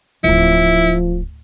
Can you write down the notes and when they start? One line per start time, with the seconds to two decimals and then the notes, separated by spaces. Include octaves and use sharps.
0.24 D1 G1 F3 E4